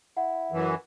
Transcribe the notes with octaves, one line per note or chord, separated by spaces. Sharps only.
E4 F#5
F#2 E3